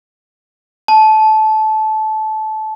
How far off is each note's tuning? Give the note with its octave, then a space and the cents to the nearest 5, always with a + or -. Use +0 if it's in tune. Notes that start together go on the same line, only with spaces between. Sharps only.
A5 -20